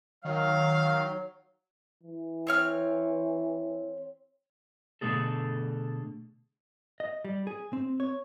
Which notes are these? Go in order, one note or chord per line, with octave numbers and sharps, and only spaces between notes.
D#3 F#3 F5
E3
C4 C#5 F6
B2 D3 F#3 A3 G#4 A4
D#5
G3
G#4
C4
C#5